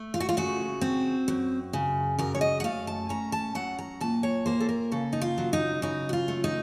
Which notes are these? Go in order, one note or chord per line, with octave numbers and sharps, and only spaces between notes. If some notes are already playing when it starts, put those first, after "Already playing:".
Already playing: A3
F4
F#4
F4
C#3 F#4
C4
F#2
C#3
F#2 A#4
C#5
D#5
F#5
A3 F5
A5
C#4 A#5
A5
F#3 F#5
A#5
A#2 A5
C#5
A#3 C5
A4
A#4
C#3 A4
D#4
F4
F#3
D#4
C#3 D#4
F#4
F4
A3
D#4